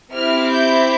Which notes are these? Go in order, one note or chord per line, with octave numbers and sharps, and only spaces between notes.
C4 E4 G4 F6
G6